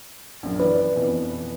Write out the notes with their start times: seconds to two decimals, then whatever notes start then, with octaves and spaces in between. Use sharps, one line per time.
0.43 A#1 F#2
0.60 E3 B4 D5
0.96 F2 B2 E3